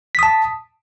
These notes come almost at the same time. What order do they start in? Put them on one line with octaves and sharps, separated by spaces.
B6 D#6 A5